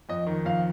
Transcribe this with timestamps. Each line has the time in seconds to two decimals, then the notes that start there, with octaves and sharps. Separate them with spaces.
0.09 F2 D#5
0.26 D#3
0.45 F2 F5